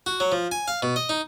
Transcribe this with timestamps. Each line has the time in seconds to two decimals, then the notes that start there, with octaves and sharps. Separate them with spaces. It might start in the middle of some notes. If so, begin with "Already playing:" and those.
0.06 F#4
0.20 F#3
0.32 F3
0.52 G#5
0.68 F5
0.82 B2
0.96 D#5
1.09 D#4